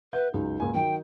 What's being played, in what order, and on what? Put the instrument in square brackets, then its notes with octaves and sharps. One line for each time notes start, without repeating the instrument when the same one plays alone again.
[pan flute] B4 [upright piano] E5 F#5 G6
[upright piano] C#2 F#2 [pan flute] D#4
[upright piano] C#2 A#2 G#5
[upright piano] D#3 F#3 [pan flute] G5